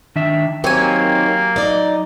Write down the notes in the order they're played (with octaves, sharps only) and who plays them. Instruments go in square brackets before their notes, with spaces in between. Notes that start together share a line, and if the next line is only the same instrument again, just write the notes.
[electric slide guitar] D#3 D4 E5
[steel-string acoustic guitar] D#3 C4 C#5 [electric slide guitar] F#3 [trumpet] A#3 [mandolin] G4 G#5
[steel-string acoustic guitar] D#4 D5